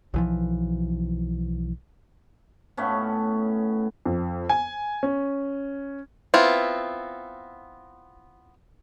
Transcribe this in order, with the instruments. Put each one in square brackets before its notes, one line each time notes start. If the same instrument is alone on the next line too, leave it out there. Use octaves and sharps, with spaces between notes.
[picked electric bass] B1 E3 F3
[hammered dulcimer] A2 A3 B3 C#4
[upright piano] F2
G#5
C#4
[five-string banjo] B3 C4 E4 F4